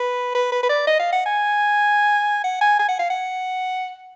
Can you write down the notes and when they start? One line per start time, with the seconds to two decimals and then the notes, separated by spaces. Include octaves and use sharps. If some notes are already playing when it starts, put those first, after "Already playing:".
Already playing: B4
0.35 B4
0.52 B4
0.63 B4
0.69 D5
0.87 D#5
1.00 F5
1.13 F#5
1.26 G#5
2.44 F#5
2.61 G#5
2.79 G#5
2.89 F#5
2.99 F5
3.10 F#5